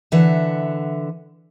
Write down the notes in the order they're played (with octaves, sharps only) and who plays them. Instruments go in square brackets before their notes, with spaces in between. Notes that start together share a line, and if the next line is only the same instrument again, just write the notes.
[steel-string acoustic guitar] D3 E3 E5 F#5